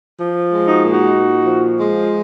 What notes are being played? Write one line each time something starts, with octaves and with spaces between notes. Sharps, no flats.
F3
G#3
D#4 F#4
A#2
D#4 F#4
A#2
F3
G#3